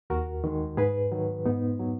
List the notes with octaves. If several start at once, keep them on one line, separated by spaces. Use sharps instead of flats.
D#2 F#4 A#4
D#3 G#3
G#2 G#4 B4
D#3 F#3
G#2 B3 D#4
F#3